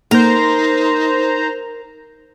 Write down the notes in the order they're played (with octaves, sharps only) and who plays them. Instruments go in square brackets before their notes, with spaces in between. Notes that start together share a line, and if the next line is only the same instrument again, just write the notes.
[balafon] A#3 [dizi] D#4 [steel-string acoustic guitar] A#4 [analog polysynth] C5 A#5